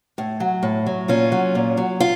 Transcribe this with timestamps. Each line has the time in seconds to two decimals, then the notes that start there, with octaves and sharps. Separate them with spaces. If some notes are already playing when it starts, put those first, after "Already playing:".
0.18 A2
0.40 F#3
0.63 A2
0.86 F#3
1.08 A#2 C#4 F4
1.32 F#3
1.55 A#2
1.77 F#3
2.00 F4